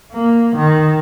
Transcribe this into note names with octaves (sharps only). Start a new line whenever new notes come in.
A#3
D#3